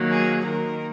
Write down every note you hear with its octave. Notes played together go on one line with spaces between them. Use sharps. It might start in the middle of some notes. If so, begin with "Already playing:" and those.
Already playing: D#3 F#3 A#3
G#4
D#3 A#3 A#4